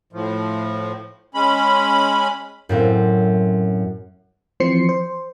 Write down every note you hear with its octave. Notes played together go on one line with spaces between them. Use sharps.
A2 F3
G#3 C#4 B5
F#2 A2 C4
E3 F3 C4 C5 C7 C#7
C5